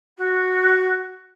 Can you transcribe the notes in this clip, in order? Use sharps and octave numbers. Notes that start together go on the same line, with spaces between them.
F#4